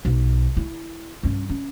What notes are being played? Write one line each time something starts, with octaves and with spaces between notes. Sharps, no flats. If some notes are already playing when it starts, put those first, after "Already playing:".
B1 B2
E4
G2 C#4
C#4